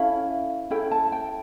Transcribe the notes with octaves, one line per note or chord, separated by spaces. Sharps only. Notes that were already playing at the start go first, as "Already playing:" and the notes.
Already playing: C#4 E4 A4 F5
C#4 E4 A4 G5
A5
G5